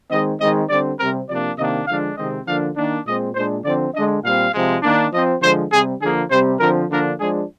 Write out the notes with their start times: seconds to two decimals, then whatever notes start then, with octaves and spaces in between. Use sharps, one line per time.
0.10 D#3 G#3 C4 D#5
0.40 D#3 G#3 C4 D#5
0.70 D3 G3 C4 D5
0.99 C3 G3 C4 A#4
1.28 C3 F3 A#3 D4 D5
1.58 C3 D#3 A#3 D4 D#5
1.87 D3 F3 G#3 D4 F5
2.17 C3 D#3 G#3 C4 D#5
2.46 D3 F3 A#3 D4 F5
2.76 D#3 A#3 D4
3.06 A#2 G#3 C4 D#5
3.35 A#2 G#3 D4 C5
3.64 D3 F3 C4 D5
3.94 D3 G#3 D4 D#5
4.24 A#2 G3 C4 F5
4.53 C3 F3 G#3
4.83 D#3 A#3 D4
5.12 F3 C4 D#5
5.42 D3 F3 G#3 C5
5.71 C3 G3 C4 G#4
6.01 D3 F3 A#3 G#4
6.30 C3 G3 C4 C5
6.60 D3 F3 C4 A#4
6.90 D3 F3 A#3 D4 A#4
7.19 F3 G#3 D4 G#4